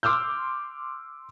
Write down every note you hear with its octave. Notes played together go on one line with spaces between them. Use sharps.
C6 D6 E6 F6 G6